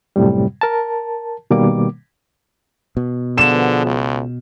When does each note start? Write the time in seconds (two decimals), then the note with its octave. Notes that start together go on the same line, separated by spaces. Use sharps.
0.16 F#2 A2 C3 G3
0.61 A#4 A5
1.51 B2 D#3 G3 A#3 D6
2.97 B2
3.38 D3 F3 B3 G#4 E7
3.86 C#2